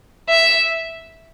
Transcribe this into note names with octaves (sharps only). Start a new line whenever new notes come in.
E5